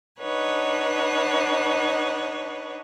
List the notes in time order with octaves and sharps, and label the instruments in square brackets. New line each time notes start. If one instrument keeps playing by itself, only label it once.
[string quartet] D4 D#4 B4 C#5 F#5